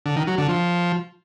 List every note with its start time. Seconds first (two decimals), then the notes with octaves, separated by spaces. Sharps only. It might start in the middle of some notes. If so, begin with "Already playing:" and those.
0.06 D3
0.16 D#3
0.27 F#3
0.38 D3
0.49 F3